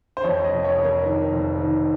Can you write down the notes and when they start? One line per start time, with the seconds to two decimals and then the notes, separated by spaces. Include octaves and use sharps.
0.17 C5
0.23 F2 C#5
0.44 D#5
0.51 F1
0.65 C#5
0.78 F2
0.84 A#4
1.05 D#3 A#4
1.32 F1
1.59 D#3